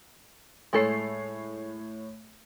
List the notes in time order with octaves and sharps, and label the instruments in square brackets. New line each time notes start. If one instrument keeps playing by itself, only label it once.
[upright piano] A2 C#5 C7 [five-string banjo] G#3 A3 A4